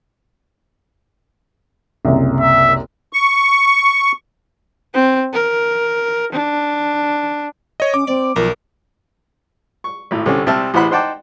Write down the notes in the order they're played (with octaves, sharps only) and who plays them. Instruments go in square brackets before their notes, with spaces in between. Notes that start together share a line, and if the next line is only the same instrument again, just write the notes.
[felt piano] F#1 C2
[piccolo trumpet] E5
[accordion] C#6
[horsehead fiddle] C4
A#4
D4
[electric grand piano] C#5 D#5
[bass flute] C#4 [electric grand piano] D6
[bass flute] C4 [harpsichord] D5
[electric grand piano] B1 [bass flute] F3 [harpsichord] A#4
[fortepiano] C#6
G#1 A2
C2 D3 C#4
C2 C4 E5 A5 F6
A1 E3 C5 F#5 B5 F#6
D#4 C5 F#5 G5 A5 D6